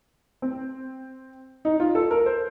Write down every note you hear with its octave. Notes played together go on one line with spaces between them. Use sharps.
C4
D#4
F4
A4
A#4
C5